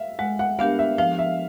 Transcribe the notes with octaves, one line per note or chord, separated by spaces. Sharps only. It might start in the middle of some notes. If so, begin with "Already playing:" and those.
Already playing: E5 F5
G#3 F#5
F#5
B3 D4 G4 A#4 F5
E5
F3 F5
E5